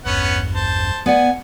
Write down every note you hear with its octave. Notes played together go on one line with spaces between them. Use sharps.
A1 E2 G2 B3 C#4 F#5
C5 A5
B3 D5 F#5 G#5